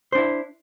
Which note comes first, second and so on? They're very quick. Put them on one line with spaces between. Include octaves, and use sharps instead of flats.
C5 D4 E4